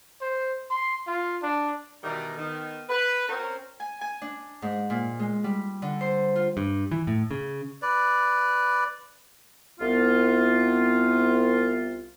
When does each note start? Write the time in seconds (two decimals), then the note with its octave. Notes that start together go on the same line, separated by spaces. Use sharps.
0.21 C5
0.71 C6
1.07 F4
1.43 D4
2.04 B2 D#3 E3 G3 D5 A#5
2.37 D#3 B3
2.89 B4
3.28 C4 C#4 F#4 A#4 C5 A#5
3.80 G#5
4.01 G#5
4.22 D4
4.62 G#2
4.90 A#2
5.19 G#3
5.44 G3
5.82 D3
6.01 C5
6.35 F4
6.57 G2
6.91 E3
7.07 A2
7.31 C#3
7.82 B4 D5
9.80 C2 B3 F4